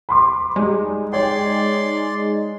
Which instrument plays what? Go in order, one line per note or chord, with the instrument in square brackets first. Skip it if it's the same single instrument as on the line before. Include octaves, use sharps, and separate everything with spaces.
[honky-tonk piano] B5 C6 D6
[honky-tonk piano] G3 [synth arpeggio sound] G#3 D#4
[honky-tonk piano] C#5 G5 [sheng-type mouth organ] D5 C6